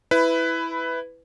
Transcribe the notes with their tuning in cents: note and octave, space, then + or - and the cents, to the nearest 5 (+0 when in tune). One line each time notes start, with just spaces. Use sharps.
E4 +0 B4 +15